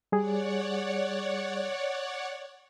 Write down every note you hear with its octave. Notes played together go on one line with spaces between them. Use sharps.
G3 G#4 C#5 D5 F#5